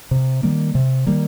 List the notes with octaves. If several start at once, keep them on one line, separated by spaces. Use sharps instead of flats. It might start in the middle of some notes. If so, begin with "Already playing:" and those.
C3
D#3 G3 A#3
C3
D#3 G3 A#3